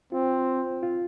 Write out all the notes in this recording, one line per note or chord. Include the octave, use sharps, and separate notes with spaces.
C4 F4
F4